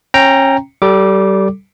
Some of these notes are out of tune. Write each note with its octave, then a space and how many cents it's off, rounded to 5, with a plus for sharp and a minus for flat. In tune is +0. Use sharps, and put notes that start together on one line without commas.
C#4 -25 G5 +0 A#5 +0
G3 -25 A4 +0 D6 +0